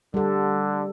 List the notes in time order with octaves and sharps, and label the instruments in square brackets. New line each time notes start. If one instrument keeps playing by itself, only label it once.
[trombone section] D3 [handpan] G3 A4